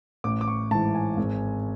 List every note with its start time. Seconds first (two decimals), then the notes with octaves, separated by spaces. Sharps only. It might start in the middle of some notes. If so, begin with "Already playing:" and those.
0.24 A1 D6
0.41 D6
0.48 C#6
0.71 G#2 A5
0.75 E3
0.95 G#5
1.17 G#1